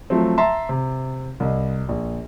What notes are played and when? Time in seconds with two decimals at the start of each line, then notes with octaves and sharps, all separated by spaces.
0.10 F3 F#3 A3 C4
0.38 E5 A5 A#5 C6
0.69 C3
1.40 C2 D#5
1.89 A#1